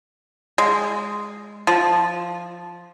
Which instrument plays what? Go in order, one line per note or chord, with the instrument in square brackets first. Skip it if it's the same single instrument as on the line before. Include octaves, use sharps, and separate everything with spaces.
[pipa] G#3
F3